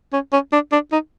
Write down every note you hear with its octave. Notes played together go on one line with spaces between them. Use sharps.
C#4
C#4
D4
D4
D#4